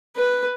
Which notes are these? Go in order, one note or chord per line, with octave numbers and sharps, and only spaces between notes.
B4